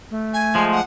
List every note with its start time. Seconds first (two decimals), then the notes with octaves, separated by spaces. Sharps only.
0.11 A3
0.34 G#5
0.55 F3 G#3
0.72 F#5